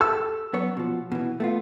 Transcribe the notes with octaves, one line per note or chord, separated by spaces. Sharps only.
G4 A4 E6
F#2 B3 C#5
B2 F3
B2 E3
A3 B3 F4